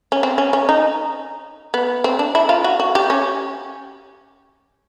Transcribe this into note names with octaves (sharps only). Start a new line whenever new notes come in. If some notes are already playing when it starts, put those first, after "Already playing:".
C#4
C4
C#4
C#4
D#4
B3
C4
D4
E4
F4
F#4
F#4
G4
C#4